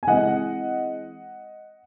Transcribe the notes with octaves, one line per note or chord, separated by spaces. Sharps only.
G#5
E3 G#3 C4 D#5 F#5